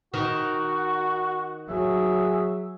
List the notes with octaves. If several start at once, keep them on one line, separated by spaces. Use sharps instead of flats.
D#3 F#4
F#3 G#4 E5